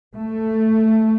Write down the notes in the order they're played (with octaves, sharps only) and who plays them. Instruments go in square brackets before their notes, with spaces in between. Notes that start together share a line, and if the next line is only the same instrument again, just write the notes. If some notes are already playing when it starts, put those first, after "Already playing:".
[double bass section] A3